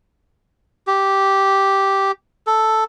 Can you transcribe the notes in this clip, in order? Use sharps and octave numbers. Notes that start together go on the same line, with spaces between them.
G4
A4